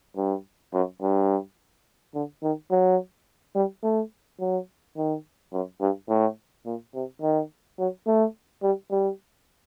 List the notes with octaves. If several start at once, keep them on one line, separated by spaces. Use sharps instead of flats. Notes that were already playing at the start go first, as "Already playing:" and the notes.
G2
F#2
G2
D3
D#3
F#3
G3
A3
F#3
D#3
F#2
G2
A2
A#2
C3
D#3
F#3
A3
G3
G3